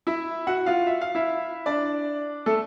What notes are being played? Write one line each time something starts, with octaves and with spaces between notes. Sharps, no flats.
E4 E5
F#4 F#5
F4 F5
E5
F5
E4 E5
D4 D5
A3 A4